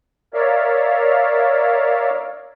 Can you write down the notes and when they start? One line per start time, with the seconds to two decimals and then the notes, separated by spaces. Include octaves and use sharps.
0.34 A#4 C#5 D5 E5 F5